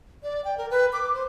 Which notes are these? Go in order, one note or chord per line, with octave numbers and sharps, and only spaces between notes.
D5
G5
A#4
B4
D6
C5